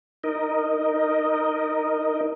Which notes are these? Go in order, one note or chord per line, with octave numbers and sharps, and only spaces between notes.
D#4 A#4 D#5